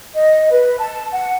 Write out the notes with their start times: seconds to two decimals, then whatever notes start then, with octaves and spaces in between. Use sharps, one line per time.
0.15 D#5
0.51 B4
0.78 A5
1.12 F#5